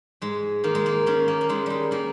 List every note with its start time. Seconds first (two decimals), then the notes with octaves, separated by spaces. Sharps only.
0.22 G#2 G#3
0.64 D#3 A#3
0.75 G#3
0.86 A#3
1.06 D#3 C#4
1.28 A#3
1.41 A#3
1.49 D#3 G#3
1.66 G3 G#3
1.91 D#3 A#3